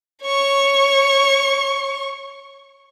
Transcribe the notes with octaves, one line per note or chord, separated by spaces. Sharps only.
C#5 C#6